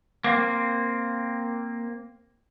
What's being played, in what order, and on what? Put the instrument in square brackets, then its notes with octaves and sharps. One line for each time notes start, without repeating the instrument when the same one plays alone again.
[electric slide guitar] A#3 C4